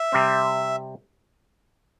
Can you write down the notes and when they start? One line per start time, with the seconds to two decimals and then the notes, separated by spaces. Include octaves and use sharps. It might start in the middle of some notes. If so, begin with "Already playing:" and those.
Already playing: E5
0.12 C3 G3 C4